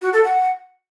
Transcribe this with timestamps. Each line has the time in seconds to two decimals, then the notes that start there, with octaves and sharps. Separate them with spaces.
0.02 F#4
0.13 A4
0.24 F#5